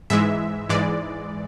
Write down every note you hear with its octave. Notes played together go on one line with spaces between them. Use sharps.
G#2 E3 G#3 E5
G#2 E3 G#3 D5